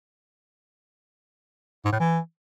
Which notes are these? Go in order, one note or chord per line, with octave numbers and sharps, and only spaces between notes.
G#2
A2
E3